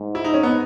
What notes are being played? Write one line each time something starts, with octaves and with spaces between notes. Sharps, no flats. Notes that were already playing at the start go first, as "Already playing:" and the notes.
Already playing: G#2
E4
D#4
C#4
B3 D#4